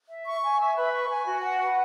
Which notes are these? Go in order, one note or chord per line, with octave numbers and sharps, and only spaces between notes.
E5
C#6
G#5
E5
B4
C#6
G#5
F#4
F#5
B4